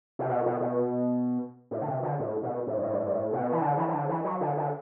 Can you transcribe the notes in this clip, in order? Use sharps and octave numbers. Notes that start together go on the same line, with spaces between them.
C3
B2
B2
B2
A2
D3
C3
D3
A2
B2
A2
G2
A2
G2
A2
G2
A2
C3
B2
E3
D3
E3
E3
D3
E3
F#3
D3
D3